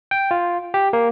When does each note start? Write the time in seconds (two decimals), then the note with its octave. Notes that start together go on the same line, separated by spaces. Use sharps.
0.11 G5
0.31 F4
0.74 G4
0.93 A#3